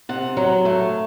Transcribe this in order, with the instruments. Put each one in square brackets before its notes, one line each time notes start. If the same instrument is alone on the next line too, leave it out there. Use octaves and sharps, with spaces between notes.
[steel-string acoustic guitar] C3 F#5
F#3
A3